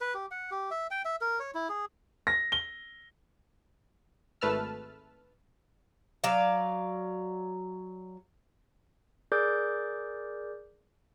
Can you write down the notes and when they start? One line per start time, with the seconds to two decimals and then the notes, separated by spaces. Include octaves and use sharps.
0.01 B4
0.14 G4
0.31 F#5
0.51 G4
0.71 E5
0.91 G5
1.05 E5
1.21 A#4
1.40 C#5
1.54 E4
1.69 G#4
2.27 A#6
2.52 G7
4.41 G#1 A3 B4 A5 E6 F6
6.24 F#3 D5 F5
9.32 G#4 A#4 D5 D6 G6